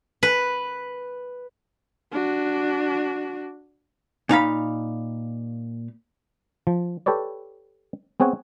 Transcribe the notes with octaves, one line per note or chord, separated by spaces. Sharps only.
B4
D4 F#4
A#2 D#4 F5 B5
F3
G4 A4 B4 C#5 D5
B3 C4 G#4 C#5 F#5 G#5